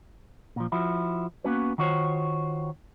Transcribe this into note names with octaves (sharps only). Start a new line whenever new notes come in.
A#2 F3
F3 E4 F#4
A#3 B3 C#4 F#4 B4
D#3 F4 F#4 C5 C#5